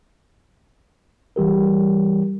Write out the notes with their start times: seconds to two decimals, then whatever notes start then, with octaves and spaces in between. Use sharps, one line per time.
1.36 E3 G3 G4 A#4